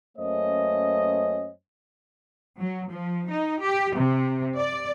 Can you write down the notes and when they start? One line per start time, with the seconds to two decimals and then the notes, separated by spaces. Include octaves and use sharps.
0.18 F#2 A3 A#3 C#4 C5 D#5
2.60 F#3
2.90 F3
3.29 D#4
3.61 G4
3.97 C3
4.57 D5